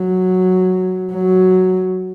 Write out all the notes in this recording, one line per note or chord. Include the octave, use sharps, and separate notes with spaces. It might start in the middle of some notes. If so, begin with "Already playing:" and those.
Already playing: F#3
F#3